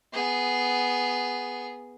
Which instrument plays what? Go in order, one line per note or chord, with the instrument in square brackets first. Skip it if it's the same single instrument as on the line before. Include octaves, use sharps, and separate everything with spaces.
[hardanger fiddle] B3 G#4